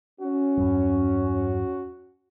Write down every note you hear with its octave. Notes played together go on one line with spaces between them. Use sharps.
C#4 F#4
E2 G2 F#3